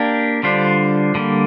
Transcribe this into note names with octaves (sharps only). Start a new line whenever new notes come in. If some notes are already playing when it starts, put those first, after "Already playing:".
Already playing: A#3 D4 G4 A#4
D3 G3 D4 F4 C5
D3 G3 A#3